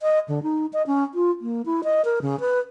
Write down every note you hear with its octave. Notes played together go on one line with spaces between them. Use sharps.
D#5
D3
D#4
D#5
C#4
F4
A#3
E4
D#5
A#4
C#3
B4